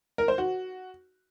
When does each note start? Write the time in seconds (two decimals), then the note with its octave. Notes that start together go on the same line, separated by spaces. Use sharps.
0.18 A#4
0.28 C5
0.38 F#4